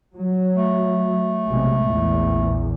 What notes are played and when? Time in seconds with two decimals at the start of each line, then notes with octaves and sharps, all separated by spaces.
0.15 F#3
0.55 A3
1.46 B1 C3 G#3
1.83 A#1 E2